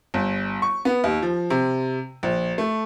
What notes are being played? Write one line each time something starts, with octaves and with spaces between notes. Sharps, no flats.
G1
C#6
B3
D#2
F3
C3
A#1
A3